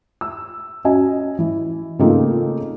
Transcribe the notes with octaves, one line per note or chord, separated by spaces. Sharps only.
E6
C#4 F#4 D#5 G#5
E3
C#3 A3 A#3 C4 D#4 F4